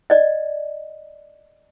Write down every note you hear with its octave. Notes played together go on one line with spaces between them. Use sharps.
D5 D#5